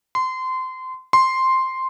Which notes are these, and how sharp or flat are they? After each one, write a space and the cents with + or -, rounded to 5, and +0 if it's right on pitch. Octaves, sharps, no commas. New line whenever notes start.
C6 -25
C6 +0